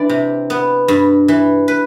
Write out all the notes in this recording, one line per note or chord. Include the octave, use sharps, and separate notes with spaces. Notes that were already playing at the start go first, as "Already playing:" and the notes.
Already playing: E3 D4 D5
C3
B3
G2
E3
B4